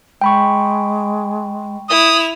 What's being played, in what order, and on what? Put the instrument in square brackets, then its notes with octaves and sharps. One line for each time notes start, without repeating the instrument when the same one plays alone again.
[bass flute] G#3 [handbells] G5 B5 C#6
[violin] E4 F7 [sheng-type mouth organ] D#6